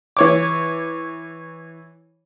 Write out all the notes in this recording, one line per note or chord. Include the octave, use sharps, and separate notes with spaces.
E3 C#5 D6